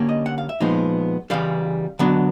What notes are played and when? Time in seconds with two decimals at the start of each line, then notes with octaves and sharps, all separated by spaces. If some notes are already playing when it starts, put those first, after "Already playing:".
Already playing: D3 G3 A#3 C#4
0.09 D#5
0.26 F#5
0.38 F5
0.49 E5
0.60 A#2 F3 G#3 B3 D#4
1.30 C#3 E3 G3 F5
1.99 D3 F#3 B3 D4